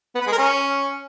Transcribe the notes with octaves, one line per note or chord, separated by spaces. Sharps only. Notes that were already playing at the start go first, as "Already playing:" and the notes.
B3
B4
G#3
A#4
C#4